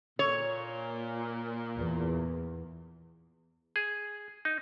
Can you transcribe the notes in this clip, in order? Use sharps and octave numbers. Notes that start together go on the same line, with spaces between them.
A#2 C#5
E2
G#4
D#4